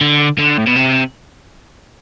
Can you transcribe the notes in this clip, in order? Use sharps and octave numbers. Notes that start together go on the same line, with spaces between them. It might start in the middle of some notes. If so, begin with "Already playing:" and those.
D3
D3
A2
B2
C3